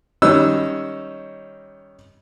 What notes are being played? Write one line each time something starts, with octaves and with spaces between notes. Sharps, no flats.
D#3 G3 C#4 D#4 D#5 E6